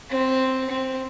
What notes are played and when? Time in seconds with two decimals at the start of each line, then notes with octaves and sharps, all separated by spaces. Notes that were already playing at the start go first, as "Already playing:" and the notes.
0.10 C4
0.69 C4